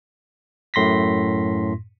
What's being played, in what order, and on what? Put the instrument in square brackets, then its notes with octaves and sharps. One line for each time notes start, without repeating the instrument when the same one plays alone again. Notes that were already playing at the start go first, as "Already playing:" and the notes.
[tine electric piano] F#2 A2 C6 A#6 B6